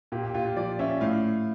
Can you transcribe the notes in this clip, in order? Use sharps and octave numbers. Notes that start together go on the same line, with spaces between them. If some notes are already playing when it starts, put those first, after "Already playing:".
A#2 G4
G4
A#2 F4
F4
F3 D5
C#4 E5
A2 F5